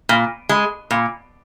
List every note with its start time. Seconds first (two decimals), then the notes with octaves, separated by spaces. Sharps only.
0.09 A#2
0.49 G#3
0.91 A#2